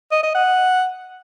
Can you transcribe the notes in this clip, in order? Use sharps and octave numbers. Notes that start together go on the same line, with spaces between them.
D#5
D#5
F#5